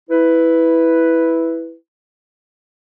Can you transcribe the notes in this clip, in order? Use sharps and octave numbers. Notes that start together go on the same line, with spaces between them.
E4 B4